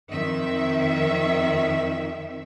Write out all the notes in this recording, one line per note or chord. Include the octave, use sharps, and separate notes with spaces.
F2 D#3 E5